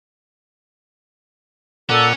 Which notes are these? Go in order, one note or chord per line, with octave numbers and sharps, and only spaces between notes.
A#2 C#4 A4 D5 F#5